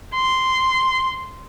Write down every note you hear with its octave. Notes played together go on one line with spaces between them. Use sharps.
C6